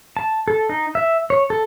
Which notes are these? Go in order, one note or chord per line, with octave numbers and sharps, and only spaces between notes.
A5
A4
D#4
E5
C#5
A4